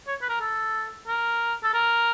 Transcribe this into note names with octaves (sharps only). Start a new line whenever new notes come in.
C#5
B4
A#4
A4
A#4
A4
A#4